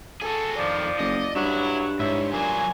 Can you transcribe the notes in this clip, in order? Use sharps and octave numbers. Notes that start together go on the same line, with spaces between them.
F#4 G#4 A4
F2 D#3 F3 D5
F#1 D#5
G2 F#3 E4
G#2 E4 C#5
A#2 F#3 C5 G#5